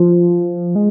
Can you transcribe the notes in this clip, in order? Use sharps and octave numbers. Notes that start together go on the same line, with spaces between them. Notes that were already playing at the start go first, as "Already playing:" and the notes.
Already playing: F3
G#3